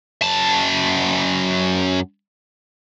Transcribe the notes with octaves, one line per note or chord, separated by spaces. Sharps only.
F#2 A5